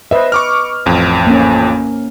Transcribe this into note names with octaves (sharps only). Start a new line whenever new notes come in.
B4 C5 D#5 E5
C#6 D6 F6
A1 F2
A#3 C#4